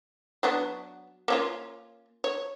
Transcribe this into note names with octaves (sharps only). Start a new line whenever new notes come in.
F#3 B3 D4
A#3 C#4 F4
C#5